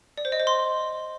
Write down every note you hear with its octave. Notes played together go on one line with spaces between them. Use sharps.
D5
C5
D#5
C5
C6